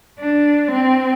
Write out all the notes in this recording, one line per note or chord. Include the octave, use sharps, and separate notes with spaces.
D4
C4